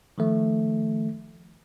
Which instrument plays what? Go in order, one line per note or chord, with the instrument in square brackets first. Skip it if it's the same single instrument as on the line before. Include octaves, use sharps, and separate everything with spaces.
[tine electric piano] D#3 F3 A3